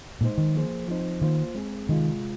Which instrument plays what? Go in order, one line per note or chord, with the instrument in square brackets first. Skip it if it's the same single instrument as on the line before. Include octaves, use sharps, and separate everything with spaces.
[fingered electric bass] A#2 [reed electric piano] G#3 D#4 C5
[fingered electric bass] D#3
[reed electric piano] F3 A#3 G#4 C5
F3 C4 D#4 C5
[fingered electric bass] D#3 [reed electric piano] A#3 F4 C5
[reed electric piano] G#3 C4 G#4
[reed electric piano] C3 G#3 F4 [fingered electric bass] D#3